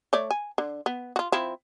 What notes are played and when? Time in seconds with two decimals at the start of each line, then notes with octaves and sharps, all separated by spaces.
0.13 A3 C#5 D5
0.31 G#5
0.58 D3
0.86 B3
1.16 F4 F#4
1.32 F3 C4 E4